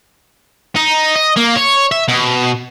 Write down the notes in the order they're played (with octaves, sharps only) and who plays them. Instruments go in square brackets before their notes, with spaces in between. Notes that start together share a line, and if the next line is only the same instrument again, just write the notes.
[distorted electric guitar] D#4
D#5
A#3
C#5
E5
B2